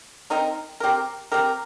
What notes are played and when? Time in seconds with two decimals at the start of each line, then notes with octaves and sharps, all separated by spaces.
0.30 C4 D#4 A#4
0.80 C4 G4 A#4
1.32 C4 G4 A#4